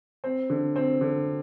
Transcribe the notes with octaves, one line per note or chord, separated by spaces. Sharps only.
C4
D3
C4
D3